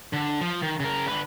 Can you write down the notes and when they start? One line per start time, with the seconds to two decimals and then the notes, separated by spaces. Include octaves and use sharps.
0.13 D3
0.41 F3
0.62 D#3
0.80 C#3 A#4
1.08 D3 B4